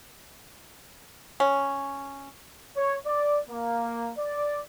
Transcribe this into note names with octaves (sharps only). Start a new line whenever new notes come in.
C#4
C#5
D5
A#3
D5